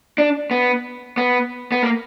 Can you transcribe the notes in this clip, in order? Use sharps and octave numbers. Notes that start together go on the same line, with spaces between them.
D4
B3
B3
B3
A#3